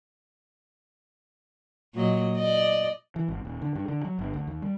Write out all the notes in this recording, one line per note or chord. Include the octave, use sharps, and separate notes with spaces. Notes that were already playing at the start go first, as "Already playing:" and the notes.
A#2 F#3 D#5
D5 D#5
E3
G#1
D#1
D3
G2
D3
F#3
G1
D2
D#2
G3